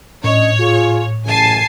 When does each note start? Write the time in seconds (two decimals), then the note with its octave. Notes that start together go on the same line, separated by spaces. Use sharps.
0.24 A2 C#4 D4 C#5 D#5
0.60 F4 G#4
1.26 A1 F#2 C#3 G#5 A5 C7